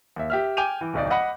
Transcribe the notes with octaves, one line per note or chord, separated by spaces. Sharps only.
D#2 E5
G4 E5 F6
G5 G#5 D6 G6 D#7 F7
E3
D1 B1 D#4 D5
D#5 F#5 B5